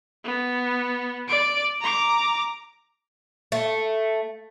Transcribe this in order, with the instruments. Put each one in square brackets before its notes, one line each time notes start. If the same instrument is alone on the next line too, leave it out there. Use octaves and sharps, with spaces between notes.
[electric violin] B3
D5 D7
A#5 D6
[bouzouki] A3